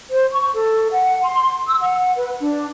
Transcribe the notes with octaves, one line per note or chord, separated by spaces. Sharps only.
C5
C#6
A4
F#5
C6
E6
F#5
B4
D4